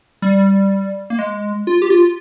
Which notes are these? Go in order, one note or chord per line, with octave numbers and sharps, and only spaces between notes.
G3
A#3
G#3
F4
G4
F4